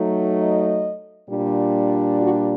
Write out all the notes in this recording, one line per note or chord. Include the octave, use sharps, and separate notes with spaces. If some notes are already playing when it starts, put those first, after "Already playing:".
Already playing: F#3 A3 D#4
D#5
A#2 G3 D4
F#4